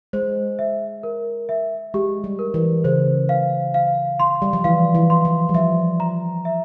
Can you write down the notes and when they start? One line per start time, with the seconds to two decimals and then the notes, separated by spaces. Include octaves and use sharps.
0.13 G#3 C5
0.59 E5
1.03 A#4
1.49 E5
1.94 G#3 G4
2.24 G3
2.39 A#4
2.54 E3
2.84 C#3 C5
3.29 F5
3.74 F5
4.20 C6
4.42 G3
4.53 F3
4.64 E3 F5
4.95 E3
5.10 C6
5.25 F3
5.49 G3
5.54 F3 E5
6.00 A#5
6.45 E5